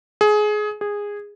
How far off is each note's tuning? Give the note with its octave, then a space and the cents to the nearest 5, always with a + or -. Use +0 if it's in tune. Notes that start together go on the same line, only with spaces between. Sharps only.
G#4 +20
G#4 -15